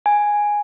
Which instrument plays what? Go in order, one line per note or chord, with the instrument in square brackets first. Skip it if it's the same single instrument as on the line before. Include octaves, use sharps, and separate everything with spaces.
[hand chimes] G#5